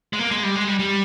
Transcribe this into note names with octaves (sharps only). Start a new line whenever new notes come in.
G#3
A#3
G#3
G3
G#3
G3
G3